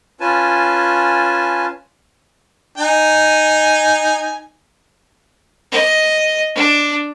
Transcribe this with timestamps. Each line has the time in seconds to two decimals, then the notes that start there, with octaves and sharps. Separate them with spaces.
0.21 C#4 F4 B4 G#5 A5
2.78 D#4 G#5
5.72 D#5
6.55 D4